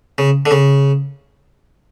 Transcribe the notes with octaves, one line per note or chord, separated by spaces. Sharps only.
C#3
D3
C#3